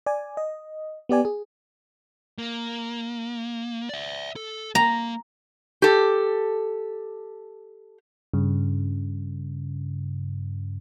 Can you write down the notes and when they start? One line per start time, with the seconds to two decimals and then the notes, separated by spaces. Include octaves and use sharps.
0.06 D5 G#5
0.37 D#5
1.09 B3 G4 D5 G#5
1.25 G#4
2.38 A#3
3.89 D5 E5
4.36 A4
4.75 A#3 A#5
5.82 G4 A4
8.34 G2 C#3